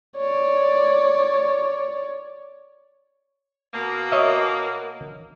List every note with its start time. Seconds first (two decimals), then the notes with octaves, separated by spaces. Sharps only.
0.17 C#5 D5
3.73 B2 A#3
4.12 C#5 D#5 E5